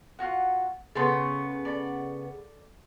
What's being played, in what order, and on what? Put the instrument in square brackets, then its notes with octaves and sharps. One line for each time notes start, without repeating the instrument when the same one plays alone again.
[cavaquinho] F4 F#4 F#5
[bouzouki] C#3 B3 [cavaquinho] A4 C#5 C6
[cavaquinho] A4 D5 B5